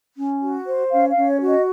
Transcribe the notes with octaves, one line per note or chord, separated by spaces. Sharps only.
C#4
F#4
C5
C#4 F5
F5
C#4
C#5
F#4
D#5